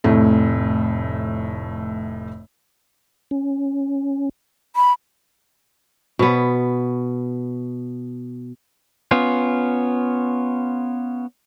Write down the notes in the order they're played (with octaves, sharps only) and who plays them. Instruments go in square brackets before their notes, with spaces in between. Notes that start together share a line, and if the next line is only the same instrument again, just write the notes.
[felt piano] F1 A2 A3
[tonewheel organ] C#4
[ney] B5
[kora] B2 B3
[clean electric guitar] B3 C#4 F4